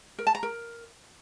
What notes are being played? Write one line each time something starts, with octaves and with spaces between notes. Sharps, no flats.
A#4
A5
A#5
A#4